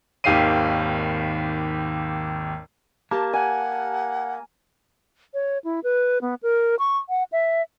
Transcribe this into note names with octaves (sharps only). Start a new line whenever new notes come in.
G#1 D#2 G4 F5 C7 D#7
A#3 G4 A5
F#5 G#5
C#5
E4
B4
B3
A#4
C#6
F#5
E5